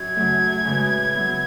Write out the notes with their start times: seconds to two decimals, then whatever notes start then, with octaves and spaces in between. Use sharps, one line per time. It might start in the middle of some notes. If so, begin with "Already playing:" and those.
Already playing: F#2 G#6
0.16 C#3 F#3 A3
0.41 F#2
0.65 C#3 E3 G#3
0.90 A2
1.14 F#3 B3 E4